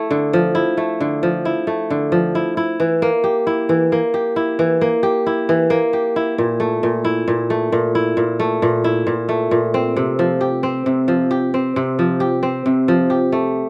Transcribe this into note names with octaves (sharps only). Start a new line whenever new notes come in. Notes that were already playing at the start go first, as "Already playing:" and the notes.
Already playing: A3 E4
D3
F3
E4
A3
D3
F3
E4
A3
D3
F3
E4
E4
E3
A#3
G4
E4
E3
A#3
G4
E4
E3
A#3
G4
E4
E3
A#3
G4
E4
A#2
A3
A#2
E4
A#2
A3
A#2
E4
A#2
A3
A#2
E4
A#2
A3
A#2
C4
C3
F3
G4
C4
C3
F3
G4
C4
C3
F3
G4
C4
C3
F3
G4
A3